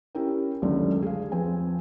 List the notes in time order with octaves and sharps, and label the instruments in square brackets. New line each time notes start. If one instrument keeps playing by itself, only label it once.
[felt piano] C#4 E4 G4 A#4 G5
C#2 F#2 D3 D#3 A3 C#4
G#4 F5
F2 F3 C4 B4 G#5